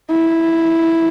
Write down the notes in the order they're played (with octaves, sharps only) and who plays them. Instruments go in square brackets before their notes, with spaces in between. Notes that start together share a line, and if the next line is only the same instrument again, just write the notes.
[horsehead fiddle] E4